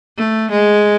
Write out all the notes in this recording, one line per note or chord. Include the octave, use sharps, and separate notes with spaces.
A3
G#3